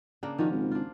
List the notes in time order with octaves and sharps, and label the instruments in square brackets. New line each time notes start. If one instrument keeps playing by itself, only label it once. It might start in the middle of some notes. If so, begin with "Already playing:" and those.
[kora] C#3 A#3 D4
[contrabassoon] D#3 [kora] F3 C#4 F#4
[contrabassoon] G#1
[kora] D4 F4